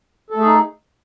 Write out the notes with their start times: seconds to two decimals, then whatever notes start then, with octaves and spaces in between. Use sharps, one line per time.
0.31 A4
0.35 A3
0.40 G#4
0.45 D#4